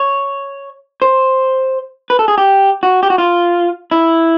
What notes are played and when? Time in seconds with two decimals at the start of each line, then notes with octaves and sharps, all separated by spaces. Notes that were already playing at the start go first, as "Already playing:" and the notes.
Already playing: C#5
1.02 C5
2.10 B4
2.19 A4
2.28 G#4
2.38 G4
2.83 F#4
3.03 G4
3.10 F#4
3.18 F4
3.91 E4